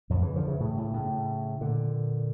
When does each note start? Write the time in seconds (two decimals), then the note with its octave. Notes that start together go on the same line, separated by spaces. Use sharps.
0.10 F2 A2
0.22 C#3 E3
0.35 D3 F3
0.48 C#3 E3
0.60 A2 C#3
0.77 A2 C#3
0.93 A2 C#3
1.61 A#2 D3